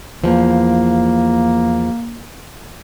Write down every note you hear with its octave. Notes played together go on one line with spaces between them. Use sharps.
E2 F3 A#3